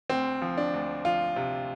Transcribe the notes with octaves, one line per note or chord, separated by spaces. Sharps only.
D2 C4
F3
D4
D2
F3 F4
C3